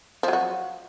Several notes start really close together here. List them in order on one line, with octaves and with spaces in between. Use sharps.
F3 F#3 F#4